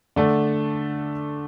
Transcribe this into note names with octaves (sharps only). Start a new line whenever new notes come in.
D3 A3 D4 A4